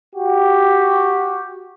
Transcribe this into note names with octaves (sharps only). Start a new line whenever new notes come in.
F#4 G4